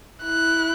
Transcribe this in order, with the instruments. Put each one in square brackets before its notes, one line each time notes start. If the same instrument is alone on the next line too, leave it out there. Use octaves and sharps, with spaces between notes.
[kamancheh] E4 [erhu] F#6